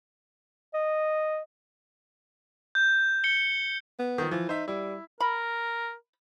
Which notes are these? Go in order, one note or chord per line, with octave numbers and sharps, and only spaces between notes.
D#5
G6
C#7 G7
B3
D#3 F3
E3 F3
D#4 C5 E5
G3 E4
A#4 B5